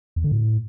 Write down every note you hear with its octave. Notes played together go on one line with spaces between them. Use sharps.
E2
D3
A2